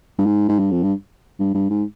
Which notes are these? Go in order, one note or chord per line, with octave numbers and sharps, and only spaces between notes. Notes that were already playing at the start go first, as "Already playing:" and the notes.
G2
G#2
G#2
G2
F2
G2
G2
G2
G#2